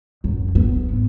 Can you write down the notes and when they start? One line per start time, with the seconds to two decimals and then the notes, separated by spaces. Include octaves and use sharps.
0.24 F#2
0.55 B3
0.90 G#2